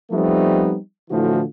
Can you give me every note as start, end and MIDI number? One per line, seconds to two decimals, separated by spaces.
0.11 0.76 53
0.11 0.76 55
0.11 0.76 57
0.11 0.76 59
0.11 0.76 60
0.11 0.76 63
1.11 1.42 45
1.11 1.42 50
1.11 1.42 52
1.11 1.42 53
1.11 1.42 65
1.11 1.42 66